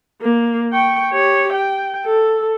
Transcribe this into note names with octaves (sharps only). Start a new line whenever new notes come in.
A#3
G5 C#6
G4 C#5
G5
A4